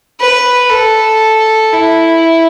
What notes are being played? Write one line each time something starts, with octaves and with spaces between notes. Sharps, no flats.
B4
A4
E4